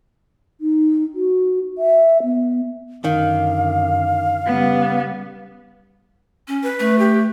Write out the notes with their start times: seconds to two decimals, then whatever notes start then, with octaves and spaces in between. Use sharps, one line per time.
0.61 D#4
1.15 F#4
1.78 E5
2.24 B3
3.04 F#2 D3 D#3 F5
4.46 C#3 G3 B3
6.48 C#4
6.63 B4
6.80 A3
6.99 G4